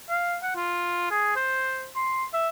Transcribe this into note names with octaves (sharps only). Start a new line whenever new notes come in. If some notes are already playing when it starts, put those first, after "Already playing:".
F5
F#5
F4
G#4
C5
C6
E5